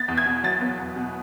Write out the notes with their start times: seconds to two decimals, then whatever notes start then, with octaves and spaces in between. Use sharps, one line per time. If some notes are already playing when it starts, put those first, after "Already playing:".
Already playing: B3 A6
0.08 E2
0.18 G#6
0.26 B2
0.44 F#3 A6
0.61 B3
0.79 E2
0.96 B2